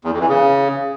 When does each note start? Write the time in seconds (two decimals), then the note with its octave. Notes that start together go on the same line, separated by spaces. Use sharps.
0.04 E2
0.12 F2
0.20 E3
0.28 C#3